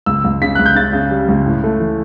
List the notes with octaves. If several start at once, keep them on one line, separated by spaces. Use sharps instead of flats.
C#2 E6
C#2
C#3 B6
C#2 F#6
G6
C#3 A6
C#3
G3
C#2
A2
A3
E3